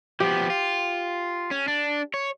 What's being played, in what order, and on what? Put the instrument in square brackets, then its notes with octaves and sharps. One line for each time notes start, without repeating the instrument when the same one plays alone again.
[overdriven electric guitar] F3 B3 [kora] G4
[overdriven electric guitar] F4
C#4
D4
C#5